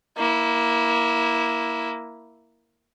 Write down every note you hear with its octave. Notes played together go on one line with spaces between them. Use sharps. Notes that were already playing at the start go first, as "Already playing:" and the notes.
A#3 E4